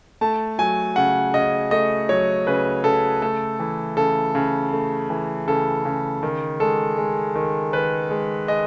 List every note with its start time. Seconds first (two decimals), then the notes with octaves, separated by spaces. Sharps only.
0.21 A3 A5
0.59 F#3 G#5
0.96 C#3 F#5
1.34 C#3 D#5
1.71 A3 D#5
2.09 F#3 C#5
2.47 C#3 B4
2.84 C#3 A4
3.22 A3 A4
3.60 E3
3.97 C#3 A4
4.35 C#3
4.72 A3
5.10 E3
5.47 C#3 A4
5.85 C#3
6.23 D#3
6.60 G#3 A4
6.98 G#3
7.35 D#3
7.73 D#3 B4
8.11 G#3
8.48 G#3 D#5